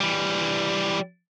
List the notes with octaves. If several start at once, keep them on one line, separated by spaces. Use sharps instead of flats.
E3 G3